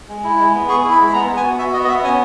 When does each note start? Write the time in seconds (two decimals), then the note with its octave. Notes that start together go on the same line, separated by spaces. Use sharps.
0.09 G#3
0.24 E4
0.39 G#3
0.54 B3
0.68 G#4 C#6
0.84 E4
0.91 B5
0.99 G#3
1.07 B5
1.13 B3 A#5
1.29 B3
1.37 G#5
1.43 F#4
1.59 F#4 E5
1.73 B3 D#5
1.84 D#5
1.88 B3 E5
2.03 C#4 G#5